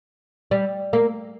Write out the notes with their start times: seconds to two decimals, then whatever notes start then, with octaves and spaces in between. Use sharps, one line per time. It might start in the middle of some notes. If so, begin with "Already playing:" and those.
0.51 G3
0.93 A#3